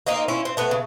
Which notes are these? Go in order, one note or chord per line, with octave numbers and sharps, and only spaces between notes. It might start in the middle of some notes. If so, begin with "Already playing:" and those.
A#3 C4 D#4 F4
C#4 E4 F4
C4
A3 B3 B4
C#3